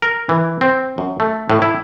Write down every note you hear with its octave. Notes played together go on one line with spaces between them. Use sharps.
A#4
E3
C4
F#2
A3
A2
E4